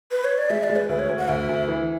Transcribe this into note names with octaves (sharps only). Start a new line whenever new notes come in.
B4
C#5
D5
G#3 E5
D5
G#3
B4
D2 B4
C#5
D2
F#5
D2 E5
D2
E3